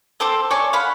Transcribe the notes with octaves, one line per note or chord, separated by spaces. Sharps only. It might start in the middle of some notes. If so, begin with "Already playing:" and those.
C4 A4 C5 D6
C#5 D5 G#5 C#6
F5 F#5 B5